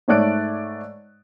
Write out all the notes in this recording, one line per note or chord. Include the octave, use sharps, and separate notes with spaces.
G#2 A3 C#5 D5 F#6 D7